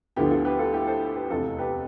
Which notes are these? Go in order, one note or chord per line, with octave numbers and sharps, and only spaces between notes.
D2 D3 F3 B3 E4 G4
F4 A4
G4 B4
F4 A4
E4 G4
A4 C5
G4 B4
F1 E2 C3 F4 A4
G4 B4